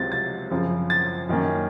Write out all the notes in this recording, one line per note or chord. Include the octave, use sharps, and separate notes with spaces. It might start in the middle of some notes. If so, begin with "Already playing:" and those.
Already playing: C#2 C3 F#3 C4 A6
A6
F#2 C#3 F3 C4
A6
F#2 D#3 A#3 C#4